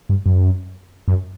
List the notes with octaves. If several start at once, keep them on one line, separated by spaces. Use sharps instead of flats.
G2
F#2
F#2